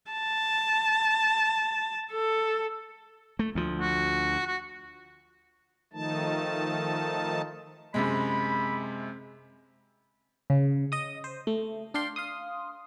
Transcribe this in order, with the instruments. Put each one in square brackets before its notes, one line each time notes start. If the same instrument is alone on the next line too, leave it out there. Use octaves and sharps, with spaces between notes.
[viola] A5
A4
[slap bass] A3
D2 F3
[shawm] F#4
F#4
[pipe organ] D#3 F3 A3 D#4 A5
[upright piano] F#2 C3 G#3 [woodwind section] B5
[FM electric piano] C#3
D#5 D#6
C5
A3
D4 D5 F5 G5 C6
F5 C6 D#6